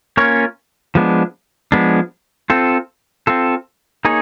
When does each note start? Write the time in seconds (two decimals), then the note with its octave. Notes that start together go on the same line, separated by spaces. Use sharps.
0.17 A#3 C#4 F4 A#4 C#5
0.95 F3 G#3 B3 D4
1.72 F3 G#3 B3 D4
2.50 C4 F4 A4
3.27 C4 F4 A4
4.05 A#3 D#4 G#4 C#5